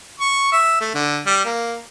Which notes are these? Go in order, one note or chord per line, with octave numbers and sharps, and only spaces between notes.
C#6
E5
A3
D3
G3
A#3